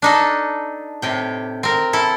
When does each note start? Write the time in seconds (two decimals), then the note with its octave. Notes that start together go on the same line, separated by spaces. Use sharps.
0.02 D4 D#4 A4
1.02 A2 C3 G5
1.63 C4 A#4
1.93 E4 A4